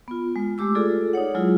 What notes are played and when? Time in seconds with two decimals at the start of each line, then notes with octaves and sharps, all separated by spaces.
0.08 B3 F4
0.36 G#3 F4
0.58 G#3 A3 G4 D6 E6
0.75 F4 G#4 A4 D5
1.13 D#4 G#4 C#5 F#5
1.35 F#3 G#3 E4 F4 G#4